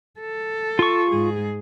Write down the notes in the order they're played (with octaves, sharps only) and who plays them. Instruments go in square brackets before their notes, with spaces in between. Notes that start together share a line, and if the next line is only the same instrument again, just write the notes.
[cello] A4
[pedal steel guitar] F4 C#6
[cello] G#2 G#4